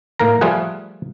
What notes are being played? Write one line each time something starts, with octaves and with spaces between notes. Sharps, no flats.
A2 A#3 A#4 A#5
F3 G3 A3 F4 G#4 F#5